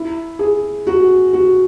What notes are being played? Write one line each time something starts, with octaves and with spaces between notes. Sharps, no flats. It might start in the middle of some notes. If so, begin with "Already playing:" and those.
Already playing: E4
G#4
F#4
F#4